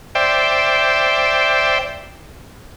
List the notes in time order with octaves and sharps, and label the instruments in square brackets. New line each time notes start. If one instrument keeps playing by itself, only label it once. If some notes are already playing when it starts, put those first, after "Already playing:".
[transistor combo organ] C5 D5 E5 G5